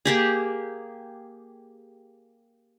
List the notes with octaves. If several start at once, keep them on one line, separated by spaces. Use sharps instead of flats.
A#3 G4 G#4